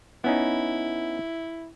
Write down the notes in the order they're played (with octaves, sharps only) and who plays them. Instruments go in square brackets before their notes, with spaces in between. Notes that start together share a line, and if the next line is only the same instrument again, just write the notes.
[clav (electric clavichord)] B3 C#4 D#4 [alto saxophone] E4